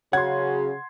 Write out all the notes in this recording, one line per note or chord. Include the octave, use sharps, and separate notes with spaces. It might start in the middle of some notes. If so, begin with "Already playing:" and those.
C#3 F#3 C#4 F#4 F#5 C6 G#6